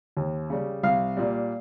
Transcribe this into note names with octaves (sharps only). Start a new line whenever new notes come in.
D#2
C#3 G3
C2 F5
A#2 G3